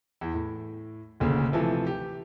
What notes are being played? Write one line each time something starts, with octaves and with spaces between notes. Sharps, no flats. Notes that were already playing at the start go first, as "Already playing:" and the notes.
E2
A2
F1 D2 A#2 C#3
C3 E3 F3 A3
G4